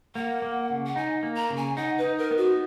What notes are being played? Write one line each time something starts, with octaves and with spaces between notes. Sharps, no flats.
A#3 F#5
A#3
C#3
F#5
D#4 G#5
A#3
A#5
C#3
G#5
D#4 F#5
B4
D#4
A#4
B3
F#4